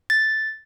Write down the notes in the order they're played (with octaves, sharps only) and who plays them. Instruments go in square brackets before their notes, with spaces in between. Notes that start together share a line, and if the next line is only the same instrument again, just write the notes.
[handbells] A6